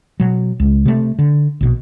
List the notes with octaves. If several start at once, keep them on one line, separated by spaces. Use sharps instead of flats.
B2 F#3
C#2
C3 A3
D3
A#1 B2